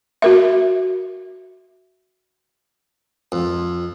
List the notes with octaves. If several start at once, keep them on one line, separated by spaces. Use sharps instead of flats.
F#4 A#4 E5
F2